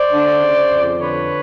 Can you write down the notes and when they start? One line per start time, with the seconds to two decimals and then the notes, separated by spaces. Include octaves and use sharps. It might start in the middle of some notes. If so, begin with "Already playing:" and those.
Already playing: C5 D5
0.12 D3
0.42 C#3
0.71 F2
1.00 D3 B4 C#5